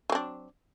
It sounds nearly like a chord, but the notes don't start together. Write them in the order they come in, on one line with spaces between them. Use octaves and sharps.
F#3 C4 D4